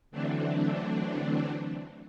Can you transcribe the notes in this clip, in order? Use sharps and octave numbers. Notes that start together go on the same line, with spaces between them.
D3 E3 F#3 A3 C4 D4